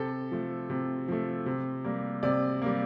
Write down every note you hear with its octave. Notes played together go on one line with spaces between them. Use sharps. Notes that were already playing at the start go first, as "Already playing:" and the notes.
Already playing: C3 A4
F3 A3
C3
F3 A3
C3
G3 A#3
C3 D5
G3 A#3